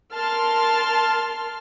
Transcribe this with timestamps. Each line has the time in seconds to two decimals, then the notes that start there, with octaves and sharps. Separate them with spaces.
0.14 A#4 A5 C6 F6